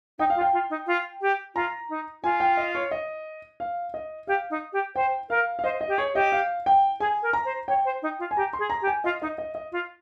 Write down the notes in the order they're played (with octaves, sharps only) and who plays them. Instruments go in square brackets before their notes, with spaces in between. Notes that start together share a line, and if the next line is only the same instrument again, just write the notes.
[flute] D#4 [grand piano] G5
[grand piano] F5
[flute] F4
[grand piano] G5
[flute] F4
D#4
F4
G4
[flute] F4 [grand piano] A#5
[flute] D#4
[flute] F4 [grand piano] G#5
[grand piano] G5
D#5
C#5
D#5
F5
D#5
[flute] G4 [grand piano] F5
[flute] D#4
G4
[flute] C5 [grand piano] G5
[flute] A#4 [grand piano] F5
[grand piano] F5
[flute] C5 [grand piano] D#5
[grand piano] D#5
[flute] G4
[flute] G#4 [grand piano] C#5
[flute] G4 [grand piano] D#5
[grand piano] F5
G5
[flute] G#4 [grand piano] G#5
[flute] A#4
[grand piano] A#5
[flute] C5
[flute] C#5 [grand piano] G5
[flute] C5
D#4
F4
[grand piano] G#5
[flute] G4 [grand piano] A#5
[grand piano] C6
[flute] G#4
[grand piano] A#5
[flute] G4
[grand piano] G#5
[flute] F4 [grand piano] D#5
[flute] D#4 [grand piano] D#5
[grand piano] D#5
D#5
[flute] F4